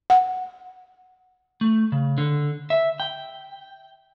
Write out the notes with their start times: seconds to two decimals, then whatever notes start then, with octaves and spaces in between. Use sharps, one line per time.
0.10 F#5
1.61 A3
1.92 C#3
2.18 D3
2.70 E5
3.00 G5